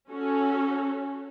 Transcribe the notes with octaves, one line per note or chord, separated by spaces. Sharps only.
C#4 F#4 A4